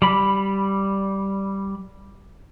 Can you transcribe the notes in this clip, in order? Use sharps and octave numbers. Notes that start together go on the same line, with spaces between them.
G3 B5